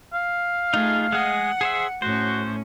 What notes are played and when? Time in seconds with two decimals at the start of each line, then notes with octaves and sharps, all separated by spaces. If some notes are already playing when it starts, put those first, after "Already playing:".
0.13 F5
0.74 A3 D#4 F4 G#4
1.12 G#3 G#4 D#5 F#5
1.61 G#4 C5 E5
2.02 A2 C#4 F#4 C5